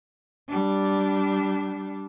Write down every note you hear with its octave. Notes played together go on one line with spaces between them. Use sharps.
G3 D4